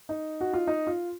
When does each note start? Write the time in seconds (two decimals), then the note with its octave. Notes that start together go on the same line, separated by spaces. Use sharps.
0.09 D#4
0.41 F#4
0.53 F4
0.67 D#4
0.87 F4